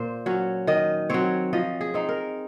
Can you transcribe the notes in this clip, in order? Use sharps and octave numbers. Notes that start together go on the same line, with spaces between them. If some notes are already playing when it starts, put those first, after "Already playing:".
Already playing: A#2 C5
F#3 C#4
D#3 D#5
F#3 C4 C#5
F3 D#5
G#4
C4 D#4
A#4